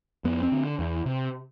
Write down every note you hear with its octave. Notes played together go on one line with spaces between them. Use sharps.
F2 B3
C4
D3
E2
C3